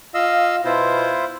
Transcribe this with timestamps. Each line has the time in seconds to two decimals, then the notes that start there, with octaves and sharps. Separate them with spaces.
0.14 F4 D#5 F5 E6
0.65 B2 E4 F4 C5